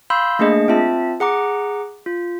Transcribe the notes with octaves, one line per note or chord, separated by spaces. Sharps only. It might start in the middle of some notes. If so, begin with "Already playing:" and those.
F5 B5 C6 E6 G6
A3 A#3 D4 G#4 D#5
C4 F4 E5 A5
G#4 F#5 A#5 D6
F4